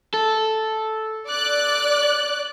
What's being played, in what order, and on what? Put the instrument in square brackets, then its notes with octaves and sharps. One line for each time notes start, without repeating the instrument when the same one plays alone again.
[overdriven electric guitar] A4
[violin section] D5 F#6